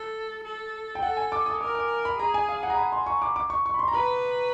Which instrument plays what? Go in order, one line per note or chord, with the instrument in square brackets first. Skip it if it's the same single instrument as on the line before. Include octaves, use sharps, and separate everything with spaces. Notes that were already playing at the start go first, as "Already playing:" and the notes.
Already playing: [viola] A4
A4
[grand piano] G5
[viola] A4 [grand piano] F#5
[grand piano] G#5
D6
D#6
[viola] A#4 [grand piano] D6
[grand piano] D6
B5
[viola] G#4 [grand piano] A#5
[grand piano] G#5
F5
F#5
A#5
B5
C6
C#6
D6
D6
C#6
C#6
B5
C6
A#5
[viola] B4 [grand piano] B5